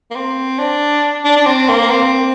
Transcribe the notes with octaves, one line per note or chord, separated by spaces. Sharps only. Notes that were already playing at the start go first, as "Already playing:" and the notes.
A#3
C4
D4
D4
D4
C4
A#3
C4